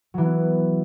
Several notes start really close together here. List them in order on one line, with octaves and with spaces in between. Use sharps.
F#3 E3 B3